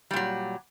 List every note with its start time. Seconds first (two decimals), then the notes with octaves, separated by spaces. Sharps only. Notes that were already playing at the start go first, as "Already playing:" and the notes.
0.11 G3
0.13 A#2
0.16 F#3